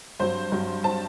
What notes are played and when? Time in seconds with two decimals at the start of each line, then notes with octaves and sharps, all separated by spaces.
0.20 G2 F#3 C4 C5
0.52 G2 F#3 C4
0.84 F#3 C4 A5